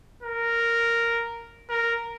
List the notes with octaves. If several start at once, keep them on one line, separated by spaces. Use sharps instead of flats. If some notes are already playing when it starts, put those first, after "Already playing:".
A#4
A#4